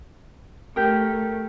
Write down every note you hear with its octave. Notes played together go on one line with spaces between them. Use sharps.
A3 G4 A#4